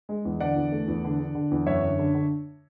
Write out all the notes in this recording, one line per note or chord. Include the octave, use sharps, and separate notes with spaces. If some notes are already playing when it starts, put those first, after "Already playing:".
G#3
E2
D3 D5 F#5
E2
A3
E2
D3
D3
D3
E2
F#2 C#5 E5
D3
D3
D3